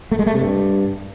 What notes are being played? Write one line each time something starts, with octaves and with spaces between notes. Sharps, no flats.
A3
G#3
A3
C3
G2